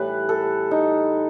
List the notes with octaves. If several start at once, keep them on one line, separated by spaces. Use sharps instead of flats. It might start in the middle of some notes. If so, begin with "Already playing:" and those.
Already playing: A2 E3 G3 B4
A4
D#4